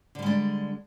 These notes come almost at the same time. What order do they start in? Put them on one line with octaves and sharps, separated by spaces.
D3 G3 G#3 D4